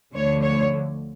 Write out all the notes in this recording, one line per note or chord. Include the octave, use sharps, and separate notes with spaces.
D2 D3 F3 A3 C#5
C#5